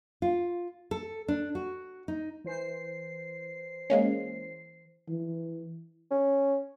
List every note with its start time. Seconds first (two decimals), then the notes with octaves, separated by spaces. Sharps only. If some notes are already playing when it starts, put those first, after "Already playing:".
0.22 F4
0.91 A4
1.28 D4
1.55 F#4
2.08 D#4
2.44 E3 C5 C7
3.90 G#3 A#3 C#4
5.09 E3
6.11 C#4